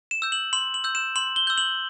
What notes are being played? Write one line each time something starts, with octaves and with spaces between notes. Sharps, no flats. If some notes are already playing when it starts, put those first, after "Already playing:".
E7
E6 G6
F#7
C6 F#7
F#7
E6 G6
E7
C6 F#7
G7
E6 G6
F#7